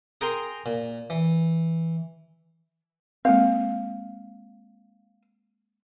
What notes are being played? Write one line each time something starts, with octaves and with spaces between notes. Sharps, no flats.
G#4 A#4 G5 G#5 A#5 C6
A#2
E3
G#3 A#3 C4 F5